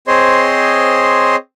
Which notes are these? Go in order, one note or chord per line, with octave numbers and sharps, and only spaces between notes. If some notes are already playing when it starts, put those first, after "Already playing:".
C4 G#4 C5 C#5 D#5 C6